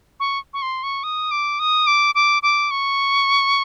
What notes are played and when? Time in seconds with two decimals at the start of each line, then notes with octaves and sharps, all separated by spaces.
0.20 C#6
0.54 C#6
0.62 C6
0.83 C#6
1.04 D#6
1.31 D6
1.59 D#6
1.87 D6
2.15 D6
2.43 D6
2.71 C#6